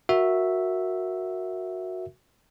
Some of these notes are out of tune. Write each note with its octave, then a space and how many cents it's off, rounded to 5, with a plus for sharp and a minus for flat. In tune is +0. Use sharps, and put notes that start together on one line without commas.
F#4 -10 A#4 +0 E5 +0